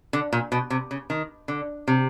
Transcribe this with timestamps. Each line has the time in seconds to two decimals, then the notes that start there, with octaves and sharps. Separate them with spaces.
0.13 D3
0.33 A#2
0.52 B2
0.70 C3
0.91 C#3
1.10 D#3
1.48 D3
1.88 C3